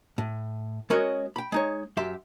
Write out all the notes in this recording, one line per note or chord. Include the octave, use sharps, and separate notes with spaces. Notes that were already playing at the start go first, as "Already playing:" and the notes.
A2
G#3 C#4 F#4 A#4 C#5 D#5
G5 B5
G#3 D#4 C#5
F#2 G4 E5 C6